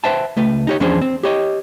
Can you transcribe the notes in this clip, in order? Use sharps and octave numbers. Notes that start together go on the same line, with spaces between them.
B4 C5 E5 G5 A5
C#2 A3 B4
D#4 G4 C#5
E2 F3 C#4 D4 G#4 C5
C4
G4 C#5 D#5